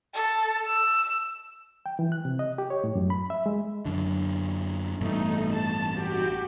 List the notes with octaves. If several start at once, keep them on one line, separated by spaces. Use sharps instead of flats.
A4
E6
G5
E3
F#6
C3
D#5
G4
C#5
A2
F#2
B5
E5
G#3
F#2 D3
A1 G2 B2 A3 D#4
A5
F#4 G4